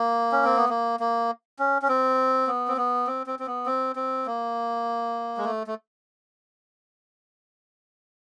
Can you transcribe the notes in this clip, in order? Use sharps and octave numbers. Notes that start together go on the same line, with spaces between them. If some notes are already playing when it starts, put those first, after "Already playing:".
Already playing: A#3
C#4
C4
B3
A#3
A#3
C#4
C#4
C4
B3
C4
B3
C4
C4
C4
B3
C4
C4
A#3
G#3
A3
A3